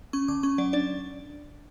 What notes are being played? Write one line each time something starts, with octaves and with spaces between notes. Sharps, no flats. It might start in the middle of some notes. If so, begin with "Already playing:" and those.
C#4 C#6
D3 D6
C#4 C#6
F#3 D5
D4 D5